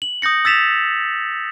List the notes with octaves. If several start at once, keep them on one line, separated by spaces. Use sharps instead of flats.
F#7
D#6 G6 A#6 C#7
E6 A6 B6 E7 F7